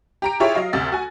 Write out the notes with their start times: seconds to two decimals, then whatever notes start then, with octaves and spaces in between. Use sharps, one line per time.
0.22 G4 A#5 D7
0.40 E4 F4 G4 G#4 C#5 E5
0.55 F#3 D#5 F5
0.73 D2 C3 A6
0.92 F#4 G#5